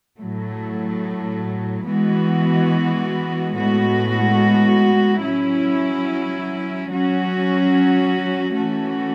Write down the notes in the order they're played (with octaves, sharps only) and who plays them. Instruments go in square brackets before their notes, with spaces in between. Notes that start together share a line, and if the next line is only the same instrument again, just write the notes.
[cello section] A2 F#3 A3
E3 G#3 B3 F#4
A2 G#3 B3 F#4
F#3 C#4 E4
F#3 C#4 F#4
E3 A3 C#4 F#4